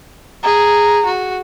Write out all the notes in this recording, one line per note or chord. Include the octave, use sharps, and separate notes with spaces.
G#4 A#5
F#4